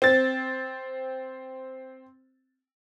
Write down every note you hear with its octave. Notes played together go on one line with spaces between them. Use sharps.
C4 A6